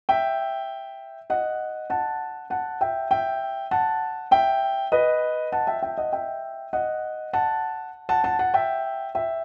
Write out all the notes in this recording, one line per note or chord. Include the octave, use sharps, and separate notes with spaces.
E5 G5
D#5 F#5
F#5 A5
F#5 A5
E5 G5
E5 G5
F#5 A5
E5 G5
B4 D#5
F#5 A5
E5 G5
E5 G5
D#5 F#5
E5 G5
D#5 F#5
F#5 A5
F#5 A5
F#5 A5
F#5 A5
E5 G5
E5 G5